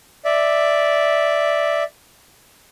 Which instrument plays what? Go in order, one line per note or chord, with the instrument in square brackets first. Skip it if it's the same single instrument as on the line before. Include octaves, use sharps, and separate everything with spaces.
[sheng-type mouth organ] D5 E5